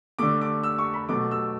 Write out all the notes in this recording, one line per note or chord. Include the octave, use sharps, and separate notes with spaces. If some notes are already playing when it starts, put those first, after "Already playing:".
D3 A3 D6
D6
E6
C#6
B5
B2 F#3 A3 D6
E6